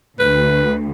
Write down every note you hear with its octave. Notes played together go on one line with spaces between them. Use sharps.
D2 B4